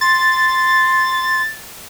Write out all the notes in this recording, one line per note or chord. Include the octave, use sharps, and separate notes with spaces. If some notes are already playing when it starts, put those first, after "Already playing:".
C6 A6